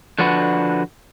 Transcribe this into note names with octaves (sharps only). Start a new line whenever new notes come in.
D3 F3 D4 F#4 B4